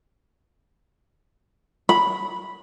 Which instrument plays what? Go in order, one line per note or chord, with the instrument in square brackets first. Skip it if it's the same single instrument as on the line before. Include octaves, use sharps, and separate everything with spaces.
[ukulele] B5